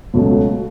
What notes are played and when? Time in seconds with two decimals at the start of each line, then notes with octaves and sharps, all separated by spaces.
0.14 C#2 B2 F#3 A3